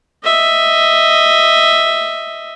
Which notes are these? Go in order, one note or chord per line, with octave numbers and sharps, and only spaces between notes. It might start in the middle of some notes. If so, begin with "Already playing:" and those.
D#5 E5